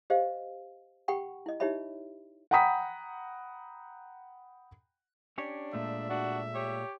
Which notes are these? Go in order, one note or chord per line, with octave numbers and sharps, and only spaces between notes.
G4 C5 D#5 F5
G4 F#5 G5 B5 C#6
E4 D#5
D#4 E4 G4 C#5 E5 B5
F#5 G5 A#5 B5 D#6 B6
C#4 D4 G4 C#5
A#2 G#3 A3 E5
D4 F#4
G4 C#5